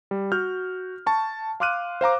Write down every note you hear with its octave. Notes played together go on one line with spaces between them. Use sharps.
G3
F#4 F6 G6
A5 C#6
F5 C6 D6 F6 F#6 D#7
C5 F5 A#5 D6